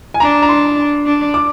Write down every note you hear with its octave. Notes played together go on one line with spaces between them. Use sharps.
G#5
D4 A#5
A#5
C6
D4
D6